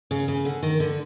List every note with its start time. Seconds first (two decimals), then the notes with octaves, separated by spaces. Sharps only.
0.11 C#3
0.28 C#3
0.45 D3
0.63 D#3
0.80 D3